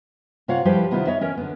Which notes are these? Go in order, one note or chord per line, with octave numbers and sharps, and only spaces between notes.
C3 F4 C#5 F5 F#5
F3 G3 E4 G4 B4 C5
C3 D#3 B3 E4 F4 G4
C#5 D#5 E5
E3 C#4 A#4 C#5
D3 B3